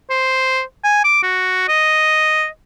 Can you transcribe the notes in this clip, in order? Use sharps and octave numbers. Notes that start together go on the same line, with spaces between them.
C5
G#5
D6
F#4
D#5